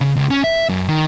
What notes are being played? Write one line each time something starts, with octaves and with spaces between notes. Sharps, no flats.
C#3
C#2
C#4
E5
F#2
D#3